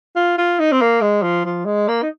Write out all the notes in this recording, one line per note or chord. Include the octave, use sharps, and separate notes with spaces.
F4
F4
D#4
C4
A#3
G#3
F3
F3
G#3
A#3
D#4